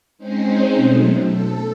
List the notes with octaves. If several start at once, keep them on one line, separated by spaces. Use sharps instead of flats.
G#3 C4 C#4 D#4 C5
B2 F#3 A3
A4